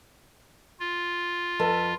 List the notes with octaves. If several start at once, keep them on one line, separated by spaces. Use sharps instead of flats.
F4
F2 A4 B4